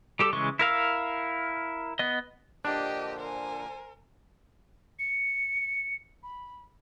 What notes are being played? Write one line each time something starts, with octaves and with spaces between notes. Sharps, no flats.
G3 G4 A4 D6
C#3 E3 G#3 C#6
E4 A#4 F5 E6
B3 D#5
A#2 D3 F3 D4 G4 D#5 G5
A#4 C5 G#5
C#7
B5